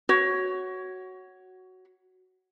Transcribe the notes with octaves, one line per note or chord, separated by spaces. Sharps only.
F#4 C#5